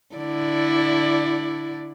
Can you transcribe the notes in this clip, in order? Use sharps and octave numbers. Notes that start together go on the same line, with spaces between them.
D3 E4 D5